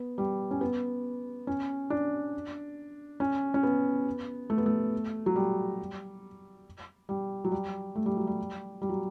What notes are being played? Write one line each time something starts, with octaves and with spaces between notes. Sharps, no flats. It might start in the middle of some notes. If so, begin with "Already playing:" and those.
Already playing: B3
G3
C#4
B3
C#4
D4
C#4
C#4
B3
A3
B3
A3
F#3
G3
G3
F#3
G3
A3
G3
F#3
G3
G3
F#3